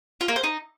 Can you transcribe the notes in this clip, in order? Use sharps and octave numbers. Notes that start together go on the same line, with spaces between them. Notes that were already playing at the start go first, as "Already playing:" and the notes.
F4
A#3
C5
D#4